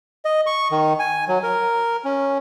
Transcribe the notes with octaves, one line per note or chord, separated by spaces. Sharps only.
D#5
C#6
D#3
G#5
F#3
A#4
C#4